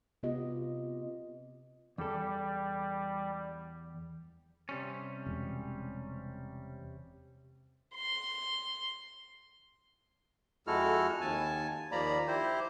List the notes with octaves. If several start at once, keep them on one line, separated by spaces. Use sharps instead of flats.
C3 B3 F4 G4 D#5
E2 G3 A4
C3 G3 C#4
E1
C6
F2 G#3 E4 F#4 A4 F6
D#2 G#5 A5
D#2 F3 A#3 D5 A#5 B5
E4 G4 C5